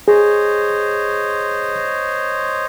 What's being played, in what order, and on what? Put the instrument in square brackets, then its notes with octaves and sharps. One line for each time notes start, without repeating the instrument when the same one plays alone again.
[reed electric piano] G#4 [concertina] C5 C#5 D#5